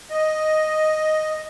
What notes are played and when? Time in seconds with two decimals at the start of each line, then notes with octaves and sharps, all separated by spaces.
0.11 D#5